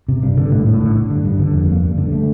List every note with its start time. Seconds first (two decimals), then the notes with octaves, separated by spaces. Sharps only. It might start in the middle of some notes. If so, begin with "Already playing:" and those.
0.08 C3
0.23 G2
0.37 D3
0.51 A2
0.66 A2
0.81 D3
0.95 D3
1.11 G2
1.25 G2
1.39 D3
1.54 F2
1.69 A#3
1.84 G2
1.98 D3
2.12 A3